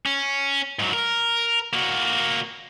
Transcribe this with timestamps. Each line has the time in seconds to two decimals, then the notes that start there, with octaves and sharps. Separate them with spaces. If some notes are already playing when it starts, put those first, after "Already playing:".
0.06 C#4
0.79 G#2 F#3
0.93 A#4
1.73 A#3 F#4